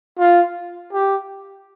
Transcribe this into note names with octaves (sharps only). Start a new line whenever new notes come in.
F4
G4